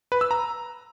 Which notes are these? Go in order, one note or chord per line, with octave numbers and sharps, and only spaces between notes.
B4
E6
A#5